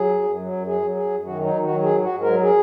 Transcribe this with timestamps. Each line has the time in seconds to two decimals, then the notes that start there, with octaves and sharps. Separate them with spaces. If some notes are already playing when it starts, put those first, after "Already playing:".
Already playing: F#3 G#4
0.09 F#2
0.23 F#2
0.38 F#3
0.52 F#2
0.66 F#3 G#4
0.81 F#3
0.95 F#2 G#4
1.10 F#2
1.24 D#3 F#4
1.39 F#3
1.44 D#4
1.54 D#3
1.63 F#4
1.69 F#3
1.83 G#2 G#4
1.97 G#2
2.02 F#4
2.12 G#2
2.21 A#4
2.27 F#3
2.41 G#4